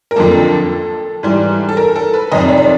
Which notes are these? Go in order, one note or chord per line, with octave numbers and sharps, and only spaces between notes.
A#4
F2 D3 F3 A#3 A4
G#2 E3 G3
A4
A#4
A4
B4
F2 C3 D#3 D#5
D5
C#5
D5